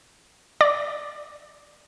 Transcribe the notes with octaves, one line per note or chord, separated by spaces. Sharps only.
D5